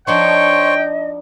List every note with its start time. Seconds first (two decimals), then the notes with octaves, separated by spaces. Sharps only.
0.07 F3 D4 D#4 C5 C#5 D#5 G5 C#6